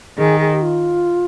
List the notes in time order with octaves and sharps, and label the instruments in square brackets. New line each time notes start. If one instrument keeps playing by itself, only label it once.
[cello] D#3 [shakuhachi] G#4
[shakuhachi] G#4
G4
F4